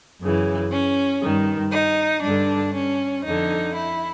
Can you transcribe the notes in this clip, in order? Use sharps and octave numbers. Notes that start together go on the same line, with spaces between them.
F#2 C#3 E3
C#4
G2 D#3
D#4
G2 D3 D4
C#4
F2 D3 D#4
E4